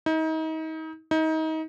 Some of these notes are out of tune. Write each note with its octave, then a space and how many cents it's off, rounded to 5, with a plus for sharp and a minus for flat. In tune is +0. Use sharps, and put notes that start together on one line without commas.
D#4 +35
D#4 +30